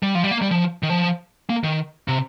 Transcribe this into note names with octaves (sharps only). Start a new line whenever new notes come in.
G3
F3
G3
A#3
G3
F3
D#3
F3
A#3
D#3
C3